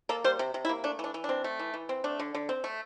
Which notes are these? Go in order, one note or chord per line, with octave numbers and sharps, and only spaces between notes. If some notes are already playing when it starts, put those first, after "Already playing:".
A#3 A4
G3 C5
C3
C3
E4
A#3
A3 D4
E3 D4
E3
D4
C4
A3
E3
E3
C4
A3 D4
D3
D3
C4
A3